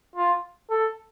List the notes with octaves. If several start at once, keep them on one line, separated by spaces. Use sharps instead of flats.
F4
A4